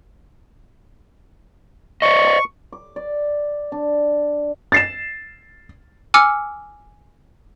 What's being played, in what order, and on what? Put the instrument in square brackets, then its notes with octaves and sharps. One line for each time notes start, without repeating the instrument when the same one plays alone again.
[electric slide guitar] C5 D5 D#5 [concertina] C#6
[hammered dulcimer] D6
D5
D4
[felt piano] A6 C7 E7
[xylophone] G#5 D6 E6 F6 C#7